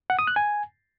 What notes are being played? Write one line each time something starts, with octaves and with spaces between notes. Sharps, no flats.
F#5
D#6
F#6
G#5